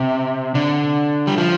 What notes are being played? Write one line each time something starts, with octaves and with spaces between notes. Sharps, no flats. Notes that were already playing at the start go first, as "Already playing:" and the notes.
Already playing: C3
D3
G3
F3